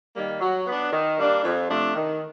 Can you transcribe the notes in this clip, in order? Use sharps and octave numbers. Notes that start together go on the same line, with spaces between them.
D#3 G3 A#3
F#3
B3 D4
D#3
G3 A#3 D4 G4
F2
C3 F3 A3 D4
D#3